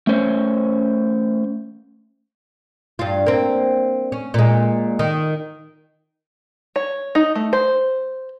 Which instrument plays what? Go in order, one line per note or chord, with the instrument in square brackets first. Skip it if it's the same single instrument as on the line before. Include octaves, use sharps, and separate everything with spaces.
[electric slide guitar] A3 C#4 C5 C#5
[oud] G2 F4
A#3 C4
C#4
A#2 G#3
D#3
[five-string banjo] C#5
D#4
A3
C5